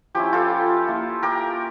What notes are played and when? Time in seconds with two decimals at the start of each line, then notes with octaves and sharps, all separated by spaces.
0.15 F3 C#4 E4 G4
0.33 F4 A4
0.87 A#3 E4
1.23 G4 A#4